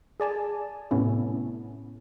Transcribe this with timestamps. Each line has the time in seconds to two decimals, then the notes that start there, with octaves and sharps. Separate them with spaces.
0.20 G#4 D5 G#5 A5
0.91 A2 C3 A3 B3 C#4 E4